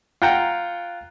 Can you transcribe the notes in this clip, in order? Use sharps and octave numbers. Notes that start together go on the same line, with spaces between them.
F4 F#5 G5 A#5